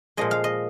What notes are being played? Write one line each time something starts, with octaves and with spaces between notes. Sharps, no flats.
A#2 F3 G#3 D#5
F5
D#5